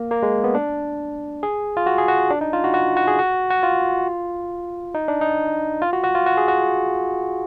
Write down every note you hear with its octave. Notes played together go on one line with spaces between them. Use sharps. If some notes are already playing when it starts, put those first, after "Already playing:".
Already playing: A#3
A#3
G#3
B3
D4
G#4
F4
F#4
G#4
F#4
D4
D#4
F4
F#4
F#4
F#4
G#4
F#4
F#4
F4
D#4
D4
D#4
F4
F#4
F#4
F4
F#4
G#4
F#4